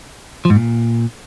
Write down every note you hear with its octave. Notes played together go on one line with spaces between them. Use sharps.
F3
G#2
A#2